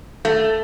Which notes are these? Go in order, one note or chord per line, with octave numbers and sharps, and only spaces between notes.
A3